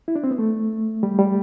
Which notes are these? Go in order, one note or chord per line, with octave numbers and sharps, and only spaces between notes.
E4
D4
C4
B3
A3
G3
G3